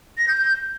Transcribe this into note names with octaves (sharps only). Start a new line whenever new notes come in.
A#6
G6
G6